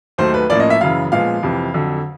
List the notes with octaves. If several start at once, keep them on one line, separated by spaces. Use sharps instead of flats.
D#2 D#3 F#3 A3 C5
B4
A2 F3 A#3 C#4 D5
D#5
E5
F#2 C#3 E3 F5
A#2 F3 G#3 B3 F5
F2 C3 E3
F2 D3 F#3